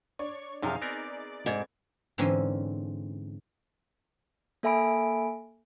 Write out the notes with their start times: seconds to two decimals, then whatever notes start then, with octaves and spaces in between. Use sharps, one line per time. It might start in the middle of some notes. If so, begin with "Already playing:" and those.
0.19 D4 C#5 D5 C#6
0.62 F#2 C3 F3 D#4 G#4 F5 G#5
0.82 B3 C4 A#4 D5
1.46 F1 G#2 G#6
2.18 G#2 D3 E3 C4 C#4
4.63 A#3 A4 E5 G#5 B5 D7